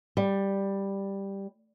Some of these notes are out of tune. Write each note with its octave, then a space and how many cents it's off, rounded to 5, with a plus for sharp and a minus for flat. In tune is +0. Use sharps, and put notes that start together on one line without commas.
G3 +5